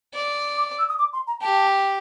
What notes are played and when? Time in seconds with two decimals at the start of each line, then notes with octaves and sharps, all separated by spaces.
0.14 D5
0.57 D6
0.79 E6
0.89 D#6
0.99 D6
1.13 C6
1.27 A#5
1.41 G4 A5